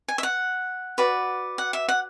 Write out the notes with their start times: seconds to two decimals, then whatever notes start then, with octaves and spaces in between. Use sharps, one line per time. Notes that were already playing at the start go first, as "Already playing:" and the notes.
0.08 G#5
0.18 E5
0.23 F#5
0.98 F#4 B4 D5
1.58 F#5
1.73 E5
1.89 F#5